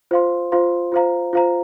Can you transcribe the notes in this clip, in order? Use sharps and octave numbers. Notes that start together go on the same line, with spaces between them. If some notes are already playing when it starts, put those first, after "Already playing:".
F4 C5 F5 C6
F4 C5 F5 C6
F4 C5 F5 A#5
F4 C5 F5 A#5